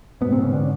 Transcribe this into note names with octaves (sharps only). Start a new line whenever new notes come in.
G#2 B2 B3
C3 C4
C#3 C#4
D3 D4